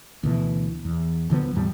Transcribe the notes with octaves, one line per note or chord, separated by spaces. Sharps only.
D2 B2 E3
E2
D1 D3 F3 B3
E2 A2 G3